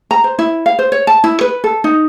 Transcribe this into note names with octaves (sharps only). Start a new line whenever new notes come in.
A#5
C5
E4
F5
C5
C#5
A5
E4
B4
A4
D#4